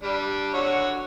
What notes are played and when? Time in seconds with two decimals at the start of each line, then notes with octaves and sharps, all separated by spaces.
0.03 G3 D4
0.54 D3 F#4 C#5